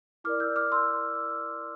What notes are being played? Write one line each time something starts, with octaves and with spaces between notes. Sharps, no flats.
E4 A#4 D5 D6 F6
E6 G6
D6 F6
C6 E6